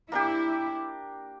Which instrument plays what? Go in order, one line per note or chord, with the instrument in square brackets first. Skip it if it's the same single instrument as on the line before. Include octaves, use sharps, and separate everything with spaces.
[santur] A#3 D4 G4 [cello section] E4